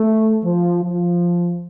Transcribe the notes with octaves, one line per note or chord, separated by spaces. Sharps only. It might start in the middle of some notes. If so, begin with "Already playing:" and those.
Already playing: A3
F3
F3